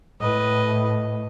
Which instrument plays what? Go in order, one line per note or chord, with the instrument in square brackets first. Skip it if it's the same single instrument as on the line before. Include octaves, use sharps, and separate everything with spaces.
[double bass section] A2 [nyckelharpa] B4 D#5